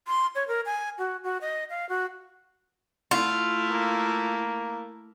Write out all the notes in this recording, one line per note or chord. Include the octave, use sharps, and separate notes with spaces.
C6
C#5
A#4
G#5
F#4
F#4
D#5
F5
F#4
A3 E4 F4
A#3